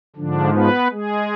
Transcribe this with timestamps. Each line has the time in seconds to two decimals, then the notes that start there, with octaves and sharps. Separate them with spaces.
0.16 G#2 D3 F3 D4
0.54 B3 B4
0.91 G#3 G#4